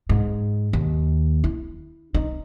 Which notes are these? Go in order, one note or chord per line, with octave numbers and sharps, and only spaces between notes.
G#2
D#2
E4
D#4